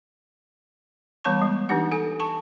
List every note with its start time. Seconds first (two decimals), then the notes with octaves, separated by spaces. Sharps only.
1.25 E3 G3 B3 C#5 A5 C#6
1.42 G#3
1.69 E3 D4 D#4 G4 F#5
1.91 A4 G#5
2.20 A5 C#6